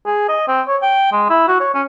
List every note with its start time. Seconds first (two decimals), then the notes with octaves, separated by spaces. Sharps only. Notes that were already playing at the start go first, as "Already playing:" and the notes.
0.06 G#4
0.29 D#5
0.48 C4
0.68 C#5
0.82 G5
1.12 G#3
1.30 E4
1.48 F#4
1.60 C#5
1.74 C#4